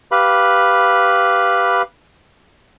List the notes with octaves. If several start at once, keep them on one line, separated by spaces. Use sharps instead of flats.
G4 B4 F5 B5